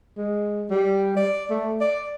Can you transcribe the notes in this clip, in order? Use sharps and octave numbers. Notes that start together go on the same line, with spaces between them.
G#3
G3
D5
A3
D5